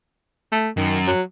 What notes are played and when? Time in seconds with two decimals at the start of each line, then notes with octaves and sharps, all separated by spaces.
0.52 A3
0.77 F#2 D#3
1.07 F#3